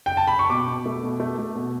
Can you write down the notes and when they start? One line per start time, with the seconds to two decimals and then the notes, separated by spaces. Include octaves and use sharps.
0.06 G5
0.17 A5
0.27 B5
0.39 C#6
0.50 B2 D6
0.68 B2
0.86 A3
1.03 B2
1.20 A3
1.38 A3
1.55 B2